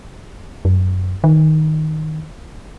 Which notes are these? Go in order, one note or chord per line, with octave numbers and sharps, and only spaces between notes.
F#2
D#3